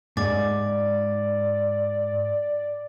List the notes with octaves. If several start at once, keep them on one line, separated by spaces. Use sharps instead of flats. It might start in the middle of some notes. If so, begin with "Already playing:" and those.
G#2 D5 D6 A6